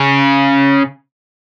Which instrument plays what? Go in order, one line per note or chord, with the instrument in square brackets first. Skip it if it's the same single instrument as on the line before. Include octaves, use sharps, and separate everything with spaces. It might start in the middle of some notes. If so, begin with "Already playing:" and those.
Already playing: [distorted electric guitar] C#3